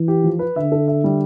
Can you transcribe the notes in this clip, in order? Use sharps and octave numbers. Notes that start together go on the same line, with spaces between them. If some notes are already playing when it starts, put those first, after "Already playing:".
Already playing: E3
G4
F3
B4
D3 E5
A4
E5
G3